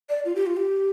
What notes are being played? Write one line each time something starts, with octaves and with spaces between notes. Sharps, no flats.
D5
F4
G4
F4
G4